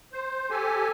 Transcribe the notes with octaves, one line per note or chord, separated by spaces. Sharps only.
C5
G4 A4 G#5